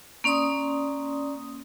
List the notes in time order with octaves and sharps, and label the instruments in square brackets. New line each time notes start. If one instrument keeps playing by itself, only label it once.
[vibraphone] A#3 C#4 D5 C6 D#6